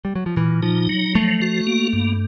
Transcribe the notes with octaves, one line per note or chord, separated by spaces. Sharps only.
G3
F#3
F3
A#2 E3
F3 D#4
F#3
F3 A3
F#4
A#3
G2